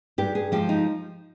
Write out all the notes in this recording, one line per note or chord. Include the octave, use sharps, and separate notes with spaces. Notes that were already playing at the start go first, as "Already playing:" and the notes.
G2 G4
G#4
F3 G#3 G4
D#4